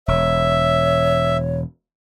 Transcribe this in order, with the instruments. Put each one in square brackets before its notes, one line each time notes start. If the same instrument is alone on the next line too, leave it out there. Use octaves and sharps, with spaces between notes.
[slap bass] E1 [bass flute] C#5 [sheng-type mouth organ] E5